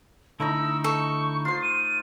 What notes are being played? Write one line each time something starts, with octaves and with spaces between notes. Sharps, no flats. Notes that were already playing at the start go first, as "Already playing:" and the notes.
D3 A3 D#4 E4 A#5 E6
A4 C#6
F4 C5 C7
D#7